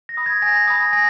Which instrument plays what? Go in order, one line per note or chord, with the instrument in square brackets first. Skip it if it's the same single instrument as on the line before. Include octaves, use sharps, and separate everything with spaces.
[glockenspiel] A#6
B5 D#6
G#6
G#5 A#6
B5 D#6
G#5 A#6